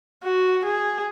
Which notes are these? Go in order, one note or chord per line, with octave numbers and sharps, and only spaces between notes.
F#4
G#4